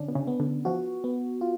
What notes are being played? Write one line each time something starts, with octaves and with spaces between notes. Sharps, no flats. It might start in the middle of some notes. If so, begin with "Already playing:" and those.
Already playing: D3 C#4 D4
B2
C#3
B3
D3
F3 F#4
B3
F4